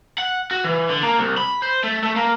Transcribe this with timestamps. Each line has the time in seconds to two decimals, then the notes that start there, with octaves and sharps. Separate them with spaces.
0.18 F#5
0.51 F#4
0.64 E3
0.89 D3
1.03 A#3
1.18 C2
1.37 B5
1.62 C5
1.84 A3
2.03 A3
2.16 A#3